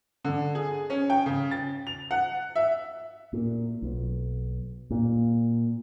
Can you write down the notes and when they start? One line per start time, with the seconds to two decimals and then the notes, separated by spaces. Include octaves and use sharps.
0.25 D3
0.55 G#4
0.90 C#4
1.10 G5
1.26 C#3
1.51 A6
1.87 F7
2.11 F#5
2.56 E5
3.33 A#2
3.82 B1
4.91 A#2